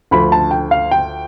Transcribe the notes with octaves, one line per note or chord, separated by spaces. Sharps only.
D2 D3 F3 B5
A5
G5
F5
G5